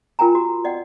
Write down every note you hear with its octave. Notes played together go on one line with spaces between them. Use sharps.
F4 A#4 G5 G#5 A#5
F#4
D5 D#5 F#5 G5